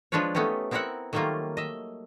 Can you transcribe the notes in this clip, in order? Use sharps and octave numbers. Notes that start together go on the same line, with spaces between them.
F3 G#3 D4 F4 B4 C#5
A3 B3 C#4 D#4 G4
B3 C4 E4 A#4 E5 F#5
D#3 F#3 G3 A3 A#3 F4
D#5 E5